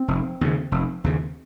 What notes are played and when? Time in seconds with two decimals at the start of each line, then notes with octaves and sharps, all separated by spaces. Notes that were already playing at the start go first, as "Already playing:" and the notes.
Already playing: C4
0.08 F1
0.41 D#2 C#3
0.72 F1
1.04 D#2 C#3